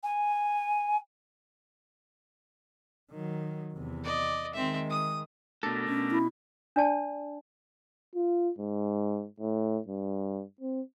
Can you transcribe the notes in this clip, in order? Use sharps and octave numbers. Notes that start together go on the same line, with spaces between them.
G#5
D#3 F#3
E2 C3
D5 D#5
D#3 G#3 C4 E5
D#6
B2 A3 D4 A4 A#4
B2 C#4
E4
D4 D5 A5
F4
G#2
A2
G2
C4